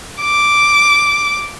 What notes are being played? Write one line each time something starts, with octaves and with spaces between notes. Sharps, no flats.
D6